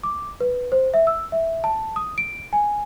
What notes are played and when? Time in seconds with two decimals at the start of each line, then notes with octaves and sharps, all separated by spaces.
0.03 D6
0.41 B4
0.72 C5
0.94 E5
1.07 E6
1.32 E5
1.64 A5
1.96 D#6
2.18 D7
2.53 G#5